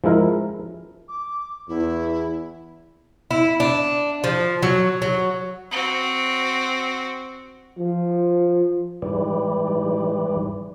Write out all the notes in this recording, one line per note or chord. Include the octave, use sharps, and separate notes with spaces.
F3 G#3 E4 A#4
D6
E2 E4
E4
D4
F3
F#3
F#3
C4 F#4
F3
G#2 E3 G3